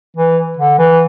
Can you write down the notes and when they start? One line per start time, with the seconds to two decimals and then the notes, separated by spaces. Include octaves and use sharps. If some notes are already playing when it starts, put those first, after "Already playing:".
0.17 E3
0.58 D3
0.78 E3